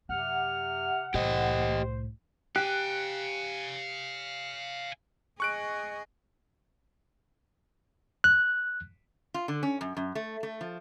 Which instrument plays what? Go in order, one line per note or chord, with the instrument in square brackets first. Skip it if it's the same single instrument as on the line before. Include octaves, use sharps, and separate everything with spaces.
[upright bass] F#2 [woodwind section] C3 F6 [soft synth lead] F#5
[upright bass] C2 A2 [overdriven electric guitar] G4 D#5 [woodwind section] C5
[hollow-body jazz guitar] G4 [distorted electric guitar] F5 G#5 [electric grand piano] F#6
[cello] G#4 D#5 [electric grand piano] C#6 F#6 D7
[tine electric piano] F#6
[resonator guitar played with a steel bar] F4
D3
C#4
F#2
F#2
A3
A3
F3